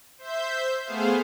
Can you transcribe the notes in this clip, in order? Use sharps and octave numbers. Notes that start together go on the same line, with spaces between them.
C5 E5 G6
A3 B3 G#4 C5 F5